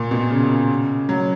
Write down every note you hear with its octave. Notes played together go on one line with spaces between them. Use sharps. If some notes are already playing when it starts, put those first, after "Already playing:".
Already playing: A#2
B2
C#3
F#3